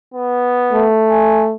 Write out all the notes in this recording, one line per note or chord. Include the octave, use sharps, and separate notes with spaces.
B3
A3
G#5